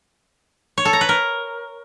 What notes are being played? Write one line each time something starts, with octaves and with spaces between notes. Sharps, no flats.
C#5
A4
A#5
B4
A#4